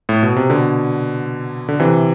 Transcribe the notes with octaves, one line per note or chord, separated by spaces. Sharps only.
A2
B2
C3
B2 D3
D3
C3 E3